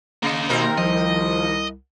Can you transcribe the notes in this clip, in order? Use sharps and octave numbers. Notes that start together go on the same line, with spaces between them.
C#3 A#3 D#5
D#2 B2 C4 A#4 A#5
C2 F3 D#5